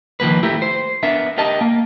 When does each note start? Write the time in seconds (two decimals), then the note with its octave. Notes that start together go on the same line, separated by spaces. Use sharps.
0.20 D#3 F3 A#3 B4
0.43 A3 E4 G4 A#4
0.62 C5
1.03 B3 D4 A#4 E5
1.38 G4 A#4 D#5 A5
1.61 A#3